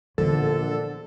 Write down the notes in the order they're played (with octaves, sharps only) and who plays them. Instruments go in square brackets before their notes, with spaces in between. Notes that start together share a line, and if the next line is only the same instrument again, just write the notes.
[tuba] A#1 [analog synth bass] D3 [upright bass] E3 B3 [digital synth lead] A4